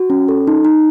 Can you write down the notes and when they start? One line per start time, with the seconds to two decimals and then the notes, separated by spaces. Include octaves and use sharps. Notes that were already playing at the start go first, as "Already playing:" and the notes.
Already playing: F#4
0.10 C#4
0.28 A4
0.47 D#4
0.65 D#4